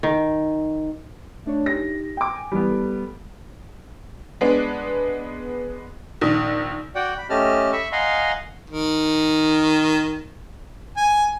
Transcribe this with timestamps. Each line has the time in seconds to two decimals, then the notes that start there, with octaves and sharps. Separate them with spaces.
0.03 D#3
1.46 A3 D4 C#5
1.66 D#4 G4 A#6
2.17 G5 D6
2.36 G#5
2.52 E3 G3 B3 E4
2.71 A4
4.41 G#3 B3 D4
6.21 A#1 D#3 D#6
6.95 F#4 D5 F#5 G5
7.18 B5
7.30 A3 C#4 G4 D#5 A5 F6
7.72 E5 B5 C#6 E6
7.92 D#5 F5 F#5 G#5 A#5 C6
8.70 D#3
10.97 G#5